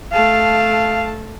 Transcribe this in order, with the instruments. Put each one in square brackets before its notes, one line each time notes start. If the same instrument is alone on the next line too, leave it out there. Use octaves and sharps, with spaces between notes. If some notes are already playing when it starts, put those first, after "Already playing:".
[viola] A3 A5 [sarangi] F5